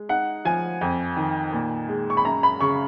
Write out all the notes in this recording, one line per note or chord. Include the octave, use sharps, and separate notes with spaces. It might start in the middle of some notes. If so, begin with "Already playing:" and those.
Already playing: G#3
D#4 F#5
F3 G#5
F2
D#3
A#2
G#3
C#6
B5
F#2 A#5
B5
C#3 C#6